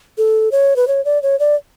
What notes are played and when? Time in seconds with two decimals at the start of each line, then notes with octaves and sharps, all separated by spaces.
0.18 A4
0.52 C#5
0.76 B4
0.88 C#5
1.05 D5
1.23 C#5
1.39 D5